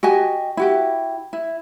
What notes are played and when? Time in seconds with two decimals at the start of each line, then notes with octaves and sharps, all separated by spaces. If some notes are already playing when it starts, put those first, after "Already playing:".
0.03 F#4 G4 D#5 G#5
0.57 E4 F#4 G4
1.33 E4